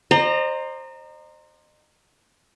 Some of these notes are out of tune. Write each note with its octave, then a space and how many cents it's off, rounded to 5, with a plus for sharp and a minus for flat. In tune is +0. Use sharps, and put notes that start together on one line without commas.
C5 +15 D#5 -40 A#5 -10